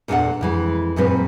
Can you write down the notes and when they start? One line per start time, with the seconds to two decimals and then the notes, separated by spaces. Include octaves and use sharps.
0.08 E2 A#2 G#3 D4 A4 F#5
0.41 F2 E3 G#3
0.96 F#2 A#2 G#3 C4 A#4 B4